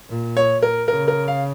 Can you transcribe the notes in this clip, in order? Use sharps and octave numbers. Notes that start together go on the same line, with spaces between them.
A#2
C#5
A#4
C#3 A#4
A#4
F5